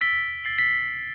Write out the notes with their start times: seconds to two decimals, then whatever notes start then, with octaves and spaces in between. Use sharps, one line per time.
0.01 E6 A6 B6 D7 G7
0.44 A6 C7 F#7
0.58 B6